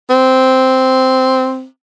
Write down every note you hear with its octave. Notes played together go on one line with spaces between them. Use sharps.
C4